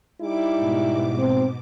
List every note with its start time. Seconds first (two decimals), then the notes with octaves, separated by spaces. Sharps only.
0.22 G3 D#4 E4 D6
0.57 G#2 B2 D6
1.19 C4